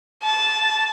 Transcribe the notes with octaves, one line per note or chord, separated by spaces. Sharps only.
A5